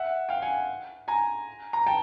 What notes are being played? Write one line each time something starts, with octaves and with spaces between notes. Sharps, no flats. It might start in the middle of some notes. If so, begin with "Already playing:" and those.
Already playing: E5 F#5
F5 G5
F#5 G#5
G#5 A#5
A#5
G5 A5